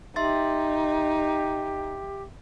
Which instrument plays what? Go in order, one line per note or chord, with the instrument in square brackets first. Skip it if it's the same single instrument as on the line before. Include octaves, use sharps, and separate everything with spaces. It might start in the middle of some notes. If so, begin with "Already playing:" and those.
[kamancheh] D#4 [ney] G4 [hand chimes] E5 C6 A6